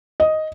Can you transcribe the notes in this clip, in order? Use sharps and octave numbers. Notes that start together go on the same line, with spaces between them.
D#5